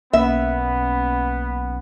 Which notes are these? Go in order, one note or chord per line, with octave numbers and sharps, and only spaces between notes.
B1 A#3 B3 C#4 E5